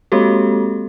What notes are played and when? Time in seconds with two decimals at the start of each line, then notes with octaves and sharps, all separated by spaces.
0.12 G#3 A#3 C4 F#4 G4 A4